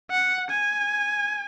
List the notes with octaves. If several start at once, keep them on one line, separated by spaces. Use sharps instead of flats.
F#5
G#5